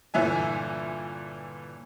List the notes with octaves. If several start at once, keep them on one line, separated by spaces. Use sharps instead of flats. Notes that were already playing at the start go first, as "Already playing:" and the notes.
G1 A#2 E3 E5 G#5